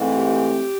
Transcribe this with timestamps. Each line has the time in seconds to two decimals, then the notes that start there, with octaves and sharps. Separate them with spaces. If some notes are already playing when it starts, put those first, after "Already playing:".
Already playing: G#2 E3 A3 C4
0.12 G4